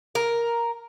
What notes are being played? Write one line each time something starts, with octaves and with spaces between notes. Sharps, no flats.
A#4